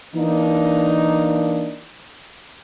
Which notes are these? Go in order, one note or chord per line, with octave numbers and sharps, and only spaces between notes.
E3 A#3 D4 D#4